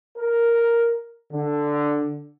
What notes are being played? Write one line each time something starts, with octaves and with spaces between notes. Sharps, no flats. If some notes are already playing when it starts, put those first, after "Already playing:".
A#4
D3